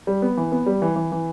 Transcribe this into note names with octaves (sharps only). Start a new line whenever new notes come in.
G3
B3
E3
B3
G3
E3
E3
E3